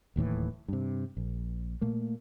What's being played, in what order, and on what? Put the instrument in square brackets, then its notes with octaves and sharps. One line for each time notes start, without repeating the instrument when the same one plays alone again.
[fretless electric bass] D1 D#2 A2 E3
G2 C3
A#1
A#2 A3 A#3